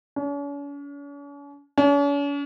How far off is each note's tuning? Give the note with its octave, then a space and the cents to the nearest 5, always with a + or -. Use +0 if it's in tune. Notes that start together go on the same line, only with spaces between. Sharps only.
C#4 +45
C#4 +45